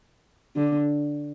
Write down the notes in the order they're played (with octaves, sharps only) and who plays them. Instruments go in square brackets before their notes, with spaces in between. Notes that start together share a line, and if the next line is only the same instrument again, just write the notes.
[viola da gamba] D3